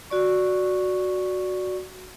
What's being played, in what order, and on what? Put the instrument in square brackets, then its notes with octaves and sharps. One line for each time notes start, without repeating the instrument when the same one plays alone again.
[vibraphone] F#4 D5 C#6